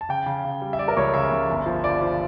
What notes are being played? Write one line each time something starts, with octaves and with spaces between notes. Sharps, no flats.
A5
C#3 G5
C#3
C#3
G3
E5
G3 D5
A#4
C#2 C#5
C#3 E5
C#2
G1
F3
G2 D5
F3